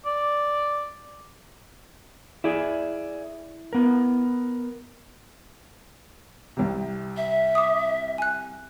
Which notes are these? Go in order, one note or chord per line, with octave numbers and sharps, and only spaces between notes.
D5
E4 G#4 D5 E5
B3 A#4
C2 C3
E5
D6 D#6
G#5 F#6